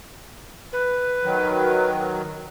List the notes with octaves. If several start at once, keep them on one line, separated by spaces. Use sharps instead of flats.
B4
D#3 F#3